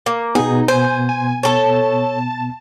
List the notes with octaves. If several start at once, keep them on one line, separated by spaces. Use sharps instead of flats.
A#3
B2 B3 D#4 G#4
C5 G#5
G#5
A4 C#5 A5